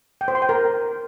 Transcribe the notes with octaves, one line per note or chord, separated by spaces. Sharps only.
G5
C5
C6
G5
A#4